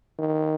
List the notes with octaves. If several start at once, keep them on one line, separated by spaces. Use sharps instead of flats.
D#3